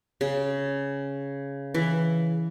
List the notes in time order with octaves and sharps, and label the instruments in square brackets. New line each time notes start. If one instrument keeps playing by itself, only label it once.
[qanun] C#3
E3